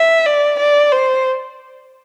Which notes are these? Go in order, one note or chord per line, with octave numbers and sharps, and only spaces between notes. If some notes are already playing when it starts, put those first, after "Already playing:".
Already playing: E5
D5
D5
C5